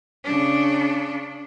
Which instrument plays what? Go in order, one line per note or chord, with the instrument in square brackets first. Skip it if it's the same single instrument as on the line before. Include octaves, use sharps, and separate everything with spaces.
[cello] C#3 D4